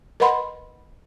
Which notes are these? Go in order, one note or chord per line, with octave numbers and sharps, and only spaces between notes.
A#4 B4 D#5 F#5 B5 C6